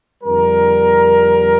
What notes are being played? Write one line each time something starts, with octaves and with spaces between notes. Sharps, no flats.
F2 D3 G3 A#4